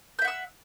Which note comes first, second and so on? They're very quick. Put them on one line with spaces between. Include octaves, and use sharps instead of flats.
G6 E5 F#5 E6